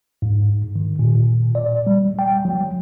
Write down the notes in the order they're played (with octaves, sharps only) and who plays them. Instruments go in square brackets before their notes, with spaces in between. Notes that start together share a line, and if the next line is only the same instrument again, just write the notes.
[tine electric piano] G#2
D#3
A#2
A#2
D5
G3
G5
F#3